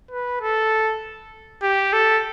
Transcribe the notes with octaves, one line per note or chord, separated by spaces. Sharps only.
B4
A4
G4
A4